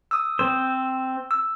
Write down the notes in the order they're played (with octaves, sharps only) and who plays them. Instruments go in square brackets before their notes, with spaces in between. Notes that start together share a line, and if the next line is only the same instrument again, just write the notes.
[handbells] D#6 E6
[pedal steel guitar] C4 C5 [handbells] E6
[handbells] E6